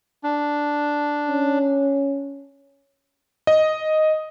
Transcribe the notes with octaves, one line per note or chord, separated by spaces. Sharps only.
D4
C#4
D#5